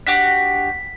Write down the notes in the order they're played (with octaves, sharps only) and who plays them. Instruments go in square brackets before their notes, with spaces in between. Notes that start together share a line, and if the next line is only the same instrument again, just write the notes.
[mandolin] D4 F#4 G4 [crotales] B6